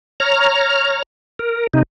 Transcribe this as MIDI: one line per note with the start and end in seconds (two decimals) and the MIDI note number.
0.20 1.03 73
0.20 1.03 82
0.20 1.03 89
1.39 1.67 70
1.73 1.83 48
1.73 1.83 63